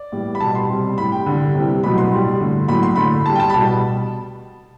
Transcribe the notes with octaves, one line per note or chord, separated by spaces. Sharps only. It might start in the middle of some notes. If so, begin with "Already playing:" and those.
Already playing: D5
A2 E3 G3
B5
B2 G3 A5
C6
C3 G3
A2 G3 B5
G5
D3 G3
C3 E3 G3
B2 F#3 A3 B5
C6
A2 G3
D3 A3
A2 F#3 A3 B5
C6
D3 A3 B5
A2 G3 A5
G5
A5
B5
B2 G3 A5